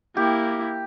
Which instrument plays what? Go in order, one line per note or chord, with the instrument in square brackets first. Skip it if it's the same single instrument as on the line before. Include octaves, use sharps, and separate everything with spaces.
[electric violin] A#3 E4 [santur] G4